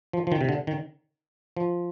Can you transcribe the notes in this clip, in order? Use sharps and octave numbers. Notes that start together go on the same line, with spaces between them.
F3
F3
D#3
C3
D3
D#3
F3